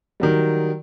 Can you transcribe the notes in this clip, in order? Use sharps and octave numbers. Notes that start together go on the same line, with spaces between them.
D#3 F#3 G3